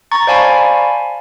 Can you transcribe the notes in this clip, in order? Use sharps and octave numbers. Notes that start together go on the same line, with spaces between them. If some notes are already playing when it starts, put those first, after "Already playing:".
A#5 C#6 A6
C5 D5 F5 G#5 A5 B5